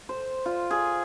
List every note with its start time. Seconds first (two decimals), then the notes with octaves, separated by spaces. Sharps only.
0.09 C5
0.46 F4
0.71 G#4